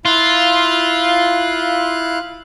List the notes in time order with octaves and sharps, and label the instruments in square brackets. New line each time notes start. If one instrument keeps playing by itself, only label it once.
[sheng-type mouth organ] E4 F5 F#6 [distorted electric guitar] F4